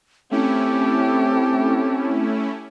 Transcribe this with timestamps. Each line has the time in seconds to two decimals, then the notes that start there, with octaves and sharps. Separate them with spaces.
0.31 A3 C4 C#4 E4 G4 A4